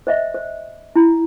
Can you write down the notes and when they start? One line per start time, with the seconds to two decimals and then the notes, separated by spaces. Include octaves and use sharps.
0.07 C5 D#5 E5
0.34 C5
0.96 E4